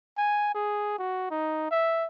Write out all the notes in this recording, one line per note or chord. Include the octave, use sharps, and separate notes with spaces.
G#5
G#4
F#4
D#4
E5